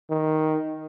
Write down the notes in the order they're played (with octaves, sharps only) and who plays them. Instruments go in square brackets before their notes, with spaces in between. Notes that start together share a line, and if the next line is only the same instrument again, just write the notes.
[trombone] D#3